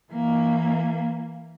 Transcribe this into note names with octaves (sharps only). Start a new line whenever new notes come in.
E3 A#3